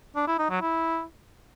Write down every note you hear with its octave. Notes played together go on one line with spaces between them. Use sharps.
D4
E4
D#4
F#3
E4